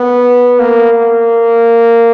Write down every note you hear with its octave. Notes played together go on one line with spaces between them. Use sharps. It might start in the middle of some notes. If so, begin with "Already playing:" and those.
Already playing: B3
A#3
A#3